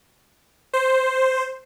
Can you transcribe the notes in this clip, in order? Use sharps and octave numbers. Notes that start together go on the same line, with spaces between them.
C5